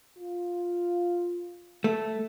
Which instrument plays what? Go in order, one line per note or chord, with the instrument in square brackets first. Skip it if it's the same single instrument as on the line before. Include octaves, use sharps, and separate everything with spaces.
[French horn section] F4
[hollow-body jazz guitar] A3